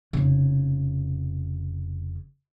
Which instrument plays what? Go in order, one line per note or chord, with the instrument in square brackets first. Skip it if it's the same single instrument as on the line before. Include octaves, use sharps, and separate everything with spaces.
[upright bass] F1 C#3